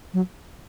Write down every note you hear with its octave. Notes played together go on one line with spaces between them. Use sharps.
F#3